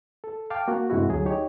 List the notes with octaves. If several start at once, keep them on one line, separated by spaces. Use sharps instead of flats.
A4
F5 G5 A5 D6
A#3 F#4
G2 C3 G#3 E4 F#4
D2 F#3 G#4
D#4 G4 C#5